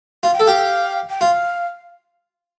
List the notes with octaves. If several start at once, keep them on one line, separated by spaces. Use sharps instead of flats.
F4 F5
G5
A4
G4 F5
G5
F4 F5